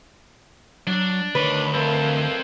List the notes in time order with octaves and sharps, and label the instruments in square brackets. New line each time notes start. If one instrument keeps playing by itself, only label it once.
[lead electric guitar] F#3 [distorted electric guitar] D4
[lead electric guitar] D2 B5 [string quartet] D#3 C#5 D6 [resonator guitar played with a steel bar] B4
[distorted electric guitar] C4 A4 [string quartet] A#4 E5 F5